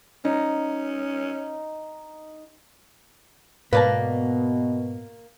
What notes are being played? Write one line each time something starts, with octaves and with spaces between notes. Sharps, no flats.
C#4 D#4
G#2 B2 A#3 B4 D5 A5